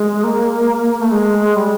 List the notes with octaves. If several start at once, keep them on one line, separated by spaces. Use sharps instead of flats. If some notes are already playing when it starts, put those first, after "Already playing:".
Already playing: G#3
A#3
A3
G#3
G3